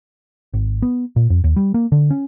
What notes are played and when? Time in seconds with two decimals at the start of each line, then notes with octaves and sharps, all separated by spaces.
0.54 G#1
0.82 B3
1.16 A#2
1.30 F2
1.44 D#2
1.56 G3
1.74 A#3
1.92 D3
2.10 C#4